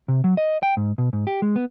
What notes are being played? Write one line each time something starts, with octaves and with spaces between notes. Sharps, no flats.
C3
F#3
D#5
G5
G#2
B2
G#2
G4
G#3
B3